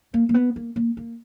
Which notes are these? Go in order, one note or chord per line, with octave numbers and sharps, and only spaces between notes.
A#3
A#3
B3
A#3
A#3
A#3